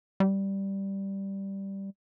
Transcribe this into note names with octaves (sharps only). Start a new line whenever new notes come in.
G3